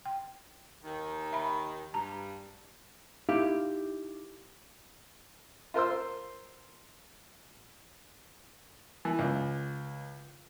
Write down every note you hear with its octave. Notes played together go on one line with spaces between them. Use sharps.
G5
D#2 D#3
E5 B5
G2 A5 A#5
D#4 E4 G4 F5
F4 A#4 C5 C6 E6
E3
C#2